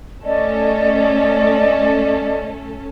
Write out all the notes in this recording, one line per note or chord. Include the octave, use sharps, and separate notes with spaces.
A3 C#4 A4 D5 D#5